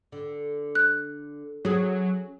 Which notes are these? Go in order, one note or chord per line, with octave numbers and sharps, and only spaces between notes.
D3
F#6
F#3 C#4 G#4